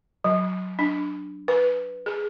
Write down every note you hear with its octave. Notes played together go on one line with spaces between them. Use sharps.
F#3
D4
B4
G#4